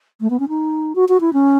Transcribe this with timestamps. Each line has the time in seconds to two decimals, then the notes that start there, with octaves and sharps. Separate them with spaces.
0.21 A3
0.30 B3
0.40 C#4
0.49 D#4
0.95 F#4
1.09 F#4
1.20 E4
1.33 C#4